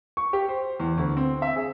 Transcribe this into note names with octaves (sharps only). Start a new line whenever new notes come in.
C#6
G4
C5
E2
D2
C4
E5
G#4